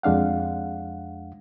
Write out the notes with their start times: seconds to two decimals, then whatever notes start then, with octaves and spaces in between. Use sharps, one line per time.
0.03 F2 G#3 D4 F5 F#5